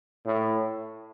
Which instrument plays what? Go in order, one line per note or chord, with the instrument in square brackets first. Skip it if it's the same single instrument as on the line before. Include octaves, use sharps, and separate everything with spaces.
[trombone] A2